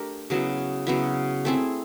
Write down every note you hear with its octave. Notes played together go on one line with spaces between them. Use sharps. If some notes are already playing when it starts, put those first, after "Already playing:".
Already playing: A3 D4 G4 A#4
C#3 F#3 B3 E4
C#3 F#3 B3 E4
A3 C4 E4 G#4